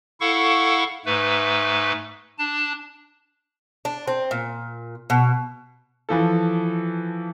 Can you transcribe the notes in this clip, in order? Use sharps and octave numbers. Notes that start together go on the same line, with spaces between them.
E4 A4 F5 F#5 C#6
G#2 A3 B4
D4 A5
D4
C4
A#2
B2
E3 F3 A4